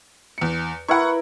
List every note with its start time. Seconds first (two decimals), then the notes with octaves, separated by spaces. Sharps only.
0.38 E2 C#7
0.88 E4 A#4 B4 F#5 C#6